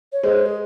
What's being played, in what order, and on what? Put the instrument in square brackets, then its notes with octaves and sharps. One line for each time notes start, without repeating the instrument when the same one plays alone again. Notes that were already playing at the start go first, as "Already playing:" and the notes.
[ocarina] C#5
[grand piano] G#3 [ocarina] C5
[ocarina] G#4